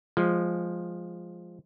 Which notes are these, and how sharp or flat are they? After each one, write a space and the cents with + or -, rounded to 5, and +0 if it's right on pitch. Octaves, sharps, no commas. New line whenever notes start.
F3 +0 G#3 -10